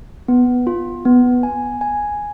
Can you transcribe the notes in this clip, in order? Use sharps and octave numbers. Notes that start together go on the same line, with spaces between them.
B3
F4
B3
G#5
G#5